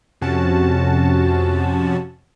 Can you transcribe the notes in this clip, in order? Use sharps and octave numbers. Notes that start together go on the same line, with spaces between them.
F2 C3 C#4 F#4 A5